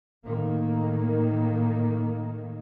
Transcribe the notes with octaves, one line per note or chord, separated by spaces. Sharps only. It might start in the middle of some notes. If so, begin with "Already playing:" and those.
A2 D#3 A#3